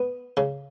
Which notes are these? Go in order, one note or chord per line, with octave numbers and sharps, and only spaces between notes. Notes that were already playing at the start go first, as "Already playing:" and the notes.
Already playing: B3
C#3